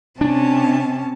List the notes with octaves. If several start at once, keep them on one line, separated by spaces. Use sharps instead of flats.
C3 C#4 D4 A5